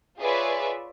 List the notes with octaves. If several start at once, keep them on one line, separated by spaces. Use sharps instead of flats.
F4 G#4 B4 C#5 D5 E5